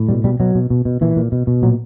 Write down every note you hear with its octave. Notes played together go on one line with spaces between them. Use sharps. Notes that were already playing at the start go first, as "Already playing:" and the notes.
Already playing: A2
B2 G3
B2 G3
B2 F#3
B2
B2
B2
A#2 E3
A#2
B2
B2
A#2 F#3